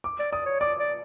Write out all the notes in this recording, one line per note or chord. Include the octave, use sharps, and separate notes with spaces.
D6
D5
D5 D#6
C#5
D5 D6
D5